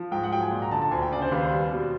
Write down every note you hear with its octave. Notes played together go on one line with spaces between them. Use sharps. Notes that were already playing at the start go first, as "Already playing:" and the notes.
Already playing: F3
G#2 G5
F#5
F#3 G5
G#5
A#2
A#5
D3 A5
A5
D2 G#5
G5
C#3 D5
C5
D#2 B4
C5
G3
B2